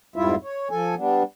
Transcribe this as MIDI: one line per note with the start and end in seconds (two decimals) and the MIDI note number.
0.16 0.35 41
0.16 0.35 44
0.16 0.35 55
0.16 0.35 64
0.16 0.35 65
0.16 0.35 76
0.43 0.68 73
0.71 0.95 53
0.71 0.95 69
0.71 0.95 80
0.97 1.23 55
0.97 1.23 59
0.97 1.23 62